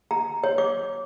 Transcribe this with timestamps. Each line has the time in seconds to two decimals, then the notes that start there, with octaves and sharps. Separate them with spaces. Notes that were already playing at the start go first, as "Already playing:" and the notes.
0.11 A#5
0.44 C#5
0.58 D6